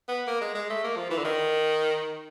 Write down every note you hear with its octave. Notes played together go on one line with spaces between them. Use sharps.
B3
A#3
G#3
G#3
A3
A#3
F3
E3
D3
D#3